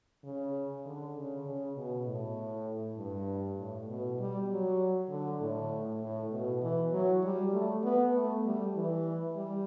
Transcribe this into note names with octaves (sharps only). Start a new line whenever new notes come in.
C#3
D3
C#3
C#3
B2
A2
G2
A2
B2
G3
F#3
D3
A2
A2
B2
E3
F#3
G3
A3
B3
A3
G3
E3
G3